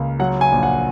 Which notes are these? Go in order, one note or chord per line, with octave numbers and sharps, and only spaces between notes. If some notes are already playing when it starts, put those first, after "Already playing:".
Already playing: C#2 A#3
F#3 F#5
G#5
A#1
F#5